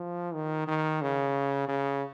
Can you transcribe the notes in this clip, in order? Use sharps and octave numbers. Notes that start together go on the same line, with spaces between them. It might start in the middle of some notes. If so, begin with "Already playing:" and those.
Already playing: F3
D#3
D#3
C#3
C#3